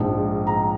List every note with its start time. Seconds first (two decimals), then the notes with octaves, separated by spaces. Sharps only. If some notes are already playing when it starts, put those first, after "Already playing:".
Already playing: A#1 G#2 F3
0.47 A#5